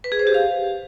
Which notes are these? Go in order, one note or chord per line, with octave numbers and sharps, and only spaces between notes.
B4
G#4
C5
G4
F5